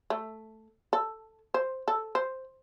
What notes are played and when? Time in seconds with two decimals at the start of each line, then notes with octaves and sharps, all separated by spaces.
0.10 A3
0.93 A4
1.54 C5
1.88 A4
2.15 C5